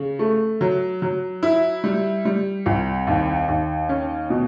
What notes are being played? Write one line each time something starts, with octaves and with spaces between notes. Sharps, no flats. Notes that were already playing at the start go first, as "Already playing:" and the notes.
Already playing: C#3
A3
F#3
F#3
E4
G3
G3
C2
D#2
D#2
C#4
B2